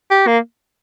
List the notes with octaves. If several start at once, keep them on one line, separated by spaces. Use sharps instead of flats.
G4
A#3